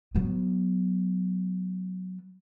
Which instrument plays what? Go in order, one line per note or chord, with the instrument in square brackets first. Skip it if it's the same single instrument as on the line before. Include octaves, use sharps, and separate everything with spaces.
[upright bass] F#3 B3